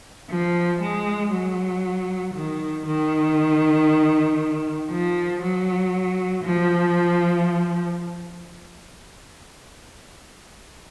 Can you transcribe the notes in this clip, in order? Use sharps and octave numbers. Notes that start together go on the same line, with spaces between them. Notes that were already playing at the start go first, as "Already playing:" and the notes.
F3
G#3
F#3
D#3
D#3
F3
F#3
F3